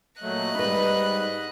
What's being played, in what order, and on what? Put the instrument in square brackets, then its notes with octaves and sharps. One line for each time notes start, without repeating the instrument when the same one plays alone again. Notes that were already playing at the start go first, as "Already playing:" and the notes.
[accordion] A#2 F#3 A3 [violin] D#5 F#6
[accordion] G#2 G3 B5 [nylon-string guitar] D#4 B4